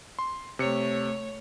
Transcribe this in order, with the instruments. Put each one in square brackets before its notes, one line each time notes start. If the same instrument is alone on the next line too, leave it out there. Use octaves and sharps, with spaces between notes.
[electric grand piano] C6
[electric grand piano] C3 C#7 [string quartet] A3 C#5